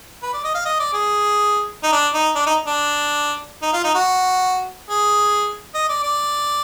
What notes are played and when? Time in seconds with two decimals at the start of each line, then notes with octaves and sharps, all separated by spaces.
0.23 B4
0.33 D5
0.44 D#5
0.54 F5
0.65 D#5
0.79 D5
0.94 G#4
1.83 D#4
1.93 D4
2.14 D#4
2.35 D4
2.46 D#4
2.67 D4
3.62 D#4
3.73 F4
3.84 D#4
3.95 F#4
4.90 G#4
5.74 D#5
5.89 D5
6.03 D5